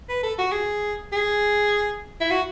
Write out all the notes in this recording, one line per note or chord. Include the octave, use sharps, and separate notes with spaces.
B4
A4
F#4
G#4
G#4
E4
F#4